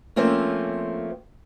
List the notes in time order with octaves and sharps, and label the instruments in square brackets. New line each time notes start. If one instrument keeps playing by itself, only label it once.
[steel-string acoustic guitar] F3 A3 A#3 C4 C#4 F4